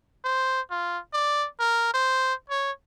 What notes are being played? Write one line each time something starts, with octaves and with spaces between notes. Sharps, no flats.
C5
F4
D5
A#4
C5
C#5